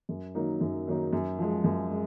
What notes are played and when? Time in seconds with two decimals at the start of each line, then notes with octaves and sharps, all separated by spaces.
0.09 F#2
0.35 D#3 F#3 A#3 D#4
0.61 F#2
0.87 D#3 F#3 A#3 D#4
1.13 F#2
1.39 F3 G#3
1.64 F#2
1.91 G#3